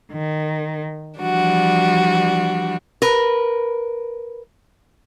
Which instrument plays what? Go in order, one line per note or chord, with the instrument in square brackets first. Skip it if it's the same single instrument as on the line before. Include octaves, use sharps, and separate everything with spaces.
[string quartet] D#3
E3 F3 G3 D4 F#4
[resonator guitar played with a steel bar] A#4 B4